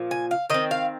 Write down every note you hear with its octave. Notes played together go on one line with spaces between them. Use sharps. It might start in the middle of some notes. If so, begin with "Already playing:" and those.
Already playing: A#2 F3
G#5
F5
D#3 C4 D#5
F5